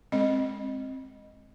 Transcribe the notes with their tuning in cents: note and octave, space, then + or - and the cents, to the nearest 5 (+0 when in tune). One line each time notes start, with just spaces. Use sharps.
G#3 +0 C4 +15 D#5 +0